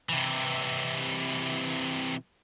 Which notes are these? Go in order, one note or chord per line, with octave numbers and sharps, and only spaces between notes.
C3 E3